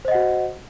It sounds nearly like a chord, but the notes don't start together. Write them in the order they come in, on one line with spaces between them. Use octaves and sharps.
C5 D#5 F#5 F#4